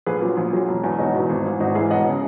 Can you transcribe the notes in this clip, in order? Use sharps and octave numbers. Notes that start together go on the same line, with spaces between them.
A#1 G#4 B4
A#2 F#3
A#1
A#2 F#3
E1
E2 B2
E1 D#4 F#4
E2 B2
G#1
G#2 E3
G#1 D#4 F#4
G#2 E3 E4 G#4
E1 D#5 F#5
C#3